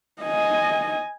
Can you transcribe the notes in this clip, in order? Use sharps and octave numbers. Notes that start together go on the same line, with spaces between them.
D#5 G#5